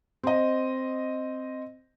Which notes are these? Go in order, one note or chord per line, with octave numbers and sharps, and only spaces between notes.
C4 D#5